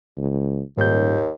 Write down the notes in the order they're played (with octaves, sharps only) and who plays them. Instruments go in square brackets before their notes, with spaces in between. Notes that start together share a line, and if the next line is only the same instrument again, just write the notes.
[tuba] C#2
[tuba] D#1 [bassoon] D#2 [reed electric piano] G#2 G6